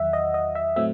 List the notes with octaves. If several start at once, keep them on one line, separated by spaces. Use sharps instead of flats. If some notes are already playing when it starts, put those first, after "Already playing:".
Already playing: E2 D#3 F#3 E5 F#5
D#5
D#5
E5
A2 F#3 A3 C4 E5